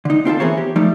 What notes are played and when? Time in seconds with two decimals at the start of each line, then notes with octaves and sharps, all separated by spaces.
0.05 D3 D#4
0.25 C4 F4 G4 A4
0.40 E3 B3 G#4 A#4 C5 C#5
0.58 G4
0.76 F3 G3 A3 D#4